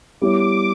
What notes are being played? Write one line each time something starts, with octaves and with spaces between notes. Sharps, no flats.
G3 B3 E4 G4 C#5 D6